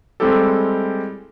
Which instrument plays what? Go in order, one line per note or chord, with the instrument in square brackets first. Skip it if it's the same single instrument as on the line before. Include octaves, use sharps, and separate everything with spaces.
[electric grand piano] G3 G#3 C4 E4 G4 A4